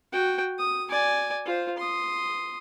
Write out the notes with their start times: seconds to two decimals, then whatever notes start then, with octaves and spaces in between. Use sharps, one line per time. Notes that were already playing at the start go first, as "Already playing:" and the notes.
0.12 F#4 G5
0.59 D#6
0.90 D5 G#5
1.46 F4 C5
1.78 C6 D#6